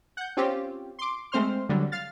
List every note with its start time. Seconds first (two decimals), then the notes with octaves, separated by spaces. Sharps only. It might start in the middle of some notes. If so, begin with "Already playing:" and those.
0.17 F#5 G6
0.37 C4 C#4 F4 G4
0.99 C6 D6
1.32 G#3 A3 C4 C5 C6 F6
1.69 D3 F#3 G3
1.92 F5 F6 A6